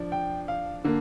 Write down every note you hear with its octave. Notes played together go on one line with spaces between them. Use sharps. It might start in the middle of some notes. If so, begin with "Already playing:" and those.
Already playing: F3 D4
G5
F5
D3 A#3